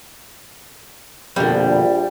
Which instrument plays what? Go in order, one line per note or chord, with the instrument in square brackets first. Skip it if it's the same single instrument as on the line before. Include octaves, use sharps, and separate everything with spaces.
[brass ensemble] A#1 [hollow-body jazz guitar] F2 B2 D3 [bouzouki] G3